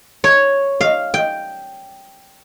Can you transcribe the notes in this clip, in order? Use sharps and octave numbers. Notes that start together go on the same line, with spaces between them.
C#5
F5
G5